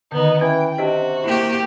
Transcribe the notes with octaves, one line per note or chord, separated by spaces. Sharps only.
D3 D#3 B3 D#4
E3 C#4 G5
C3 D4 F#4 G4 D#5
A#3 E4 G4